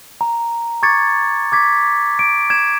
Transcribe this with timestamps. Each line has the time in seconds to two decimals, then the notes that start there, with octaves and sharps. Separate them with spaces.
0.21 A#5
0.83 C#6 D6 G#6 A6 C#7
1.52 D6 G#6 B6
2.19 D7
2.50 G#6 E7